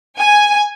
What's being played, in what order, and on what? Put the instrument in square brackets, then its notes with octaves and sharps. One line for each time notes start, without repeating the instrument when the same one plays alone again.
[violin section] G#5